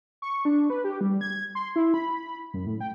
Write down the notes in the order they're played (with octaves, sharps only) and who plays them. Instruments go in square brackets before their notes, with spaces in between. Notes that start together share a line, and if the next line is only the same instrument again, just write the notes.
[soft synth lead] C#6
D4
B4
G4
G3
G#6
C6
E4
B5
F#2
A2
G5